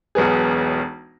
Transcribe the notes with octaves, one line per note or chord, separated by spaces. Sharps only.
E1 B1 B3 G#4